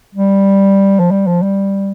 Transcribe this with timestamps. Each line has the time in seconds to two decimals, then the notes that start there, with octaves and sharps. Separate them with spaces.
0.15 G3
0.99 F3
1.11 G3
1.27 F3
1.43 G3